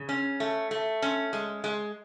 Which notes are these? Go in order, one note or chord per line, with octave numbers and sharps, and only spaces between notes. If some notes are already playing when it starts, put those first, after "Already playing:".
Already playing: C#3
C#4
A3
A3
C#4
G#3
G#3